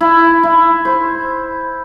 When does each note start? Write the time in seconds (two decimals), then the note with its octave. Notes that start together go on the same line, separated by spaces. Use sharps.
0.01 E4
0.43 E4
0.85 C5